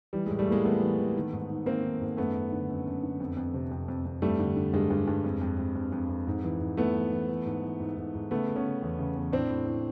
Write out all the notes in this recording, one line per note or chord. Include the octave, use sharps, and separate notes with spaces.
E3 G3
G#3
A2
G3 A3
A2 G#3 A#3
E3 A3 B3
E3
E3
D#3
G#2
D#3
D#3 A#3 C4
D#3
G#2
F#2 A3 B3
F#2
D3
F#2
F#2
D3
F2
F2
C3
F2
F2
F2
G2 G3 A3
D3
D3
G2 G#3
G2
G2
F2
F2
F2
F2
F2
F2
G#2
E3
G#2
E3 A3 B3
E3
E3
E3
G#2
E3
G#2
G#2
G#2
C#3 A3 B3
C#3
B3 C#4
C#3
E2
C#3
E2
A2 C4 D4
A2
A2